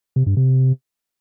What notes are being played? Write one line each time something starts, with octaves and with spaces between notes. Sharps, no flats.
C3
G2
C3